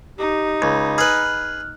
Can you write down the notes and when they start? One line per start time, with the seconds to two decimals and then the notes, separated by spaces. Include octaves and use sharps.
0.18 D#4 G4
0.62 C#2 B5
0.98 G#4 B4 F6 F#6